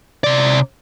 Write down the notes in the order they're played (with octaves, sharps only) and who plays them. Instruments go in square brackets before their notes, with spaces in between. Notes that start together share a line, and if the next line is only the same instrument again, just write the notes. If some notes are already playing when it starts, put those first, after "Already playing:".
[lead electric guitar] C3 D5